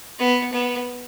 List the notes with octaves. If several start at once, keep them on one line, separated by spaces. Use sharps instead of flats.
B3
B3